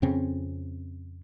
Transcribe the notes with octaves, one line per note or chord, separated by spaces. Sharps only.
F2 C#3 C4 C#4